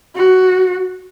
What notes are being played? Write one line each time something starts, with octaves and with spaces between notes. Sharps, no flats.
F#4